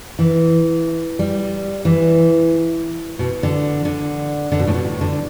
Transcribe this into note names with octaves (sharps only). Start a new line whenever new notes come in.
E3
G3
E3
B2
D3
D3
D3
B2
A2
B2
A2
D3